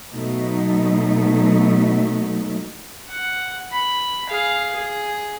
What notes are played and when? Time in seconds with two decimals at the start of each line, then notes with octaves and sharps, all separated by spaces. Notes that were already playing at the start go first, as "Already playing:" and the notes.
0.15 B2 F#3 A3 D#4
3.11 F#5
3.71 B5
4.30 G#4 F5
4.76 G#4